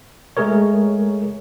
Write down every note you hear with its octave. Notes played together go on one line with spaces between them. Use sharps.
G#3 A3 G#4 A#4 C#5